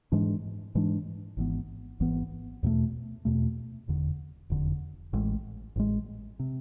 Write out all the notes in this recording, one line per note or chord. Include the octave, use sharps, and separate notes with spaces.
G#2 E3 G#3 D4
G#2 E3 G#3 D4
G#1 G#2 E3 B3
G#1 G#2 E3 B3
E2 B2 A3
E2 B2 A3
F1 E2 D3
F1 E2 D3
A1 A2 G#3
A1 A2 G#3
C3